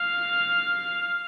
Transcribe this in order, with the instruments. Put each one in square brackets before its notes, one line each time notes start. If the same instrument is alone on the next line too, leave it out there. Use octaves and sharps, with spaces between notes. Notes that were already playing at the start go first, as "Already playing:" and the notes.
Already playing: [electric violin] F5